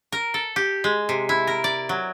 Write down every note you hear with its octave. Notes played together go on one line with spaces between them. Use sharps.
A#4
A4
G4
G#3
C3
E4
A#4
D5
F#3